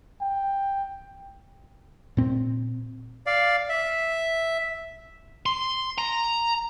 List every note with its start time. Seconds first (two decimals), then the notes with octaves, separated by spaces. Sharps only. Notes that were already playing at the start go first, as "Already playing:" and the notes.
0.21 G5
2.17 A#2 C4
3.27 D5 F5
3.69 E5
5.46 C6
5.98 A#5